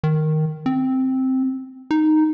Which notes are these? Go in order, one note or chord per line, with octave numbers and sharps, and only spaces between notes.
D#3
C4
D#4